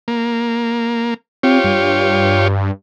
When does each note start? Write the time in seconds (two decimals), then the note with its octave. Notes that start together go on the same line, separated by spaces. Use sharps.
0.08 A#3
1.43 C4 F4 G4 C#5
1.64 G2